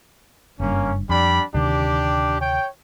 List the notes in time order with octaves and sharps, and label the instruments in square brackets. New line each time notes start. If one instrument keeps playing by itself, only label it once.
[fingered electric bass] F#1 G2 [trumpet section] A#3 C#4
[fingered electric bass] F2 [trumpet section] G3 D4 B5
[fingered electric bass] D2 C3 D#3 [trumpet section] D4 G4
[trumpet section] C#5 G5